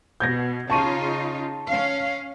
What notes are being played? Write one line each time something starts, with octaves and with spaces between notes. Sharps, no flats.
B2 G6 G#6 A#6
C#3 D#4 F4 A5 C#6 D#7
C#4 F5